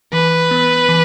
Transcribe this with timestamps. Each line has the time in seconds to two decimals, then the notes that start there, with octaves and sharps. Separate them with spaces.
0.13 E3 B4
0.51 B3
0.89 E3